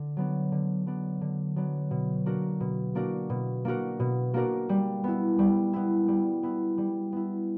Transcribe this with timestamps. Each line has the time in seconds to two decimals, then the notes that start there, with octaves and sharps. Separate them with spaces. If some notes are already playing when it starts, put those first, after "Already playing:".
Already playing: D3
0.17 F#3 B3 D4
0.52 D3
0.86 F#3 B3 D4
1.21 D3
1.56 F#3 B3 D4
1.91 B2
2.26 A#3 D4 F#4 A#4
2.60 B2
2.95 A#3 D4 F#4 A#4
3.30 B2
3.65 A#3 D4 F#4 A#4
4.00 B2
4.34 A#3 D4 F#4 A#4
4.69 G3
5.04 B3 E4
5.39 G3
5.73 B3 E4
6.08 G3
6.43 B3 E4
6.78 G3
7.12 B3 E4